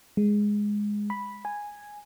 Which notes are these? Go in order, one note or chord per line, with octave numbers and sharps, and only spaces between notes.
G#3
B5
G#5